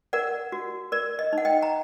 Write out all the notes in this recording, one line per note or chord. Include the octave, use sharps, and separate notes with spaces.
A#4 D5 F#5
F#4
A#4 D5
D#5
D#4
F#5
D#5 G5
A#5